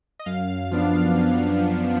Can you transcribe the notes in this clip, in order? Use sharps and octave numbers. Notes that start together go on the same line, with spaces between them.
D#5
F#2 F5
F3 B3 D4
F#2